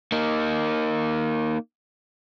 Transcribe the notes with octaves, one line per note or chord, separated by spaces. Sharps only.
A#3 D#4